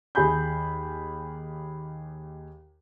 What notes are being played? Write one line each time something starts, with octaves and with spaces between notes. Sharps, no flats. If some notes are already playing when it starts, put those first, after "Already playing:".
D#2 G#4 G#5 B5 G6